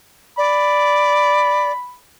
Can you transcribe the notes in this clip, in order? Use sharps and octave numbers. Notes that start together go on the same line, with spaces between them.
D5 B5